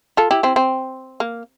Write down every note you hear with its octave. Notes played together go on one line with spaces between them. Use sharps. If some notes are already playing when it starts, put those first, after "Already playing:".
F4 A4
E4 G4
C4 E4
C4
A#3